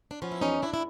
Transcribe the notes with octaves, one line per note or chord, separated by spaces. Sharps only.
D4
F3 B3 C#4
E4
E2 C#4 D#4
E2 D4 E4
E4